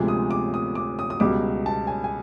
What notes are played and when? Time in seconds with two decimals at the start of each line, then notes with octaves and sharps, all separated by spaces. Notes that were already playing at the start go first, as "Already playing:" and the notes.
Already playing: D2 C3 F3 G#3 D6
0.08 D#6
0.31 D6
0.54 D#6
0.75 D6
0.99 D#6
1.10 D#6
1.20 C#2 B2 G3 D6
1.66 A5
1.87 G#5
2.04 G#5